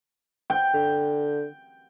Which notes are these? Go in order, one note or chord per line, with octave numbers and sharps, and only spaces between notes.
G5
D3